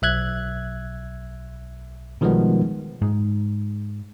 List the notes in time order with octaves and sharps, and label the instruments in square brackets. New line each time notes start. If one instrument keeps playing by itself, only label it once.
[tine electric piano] B1 E5 F#6 G#6
B2 D#3 F3 G3 G#3 B3
[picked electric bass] G#2